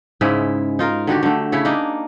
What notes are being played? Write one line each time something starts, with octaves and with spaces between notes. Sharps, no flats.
G#2 C#3 G#3 E4
D#4 F4 A#4
D3 D#3 F#4 G4
D3 A3
C#3 E4 C#5
A#3 D4 D#4